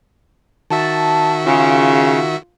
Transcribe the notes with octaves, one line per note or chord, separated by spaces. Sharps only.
D#3 F#4 E5 A5
C#3 F4